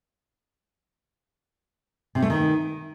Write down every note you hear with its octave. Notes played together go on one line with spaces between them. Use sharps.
C3
A3
D#3